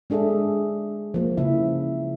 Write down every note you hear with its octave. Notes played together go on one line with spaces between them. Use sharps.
G#3 D4 G#4 A4 E5
F3 A#3
C#3 E4 E5